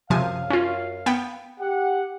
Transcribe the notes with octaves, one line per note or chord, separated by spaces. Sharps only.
F#2 C3 F3 F5 G#5
C#4 F4
B3 G5
G4 F#5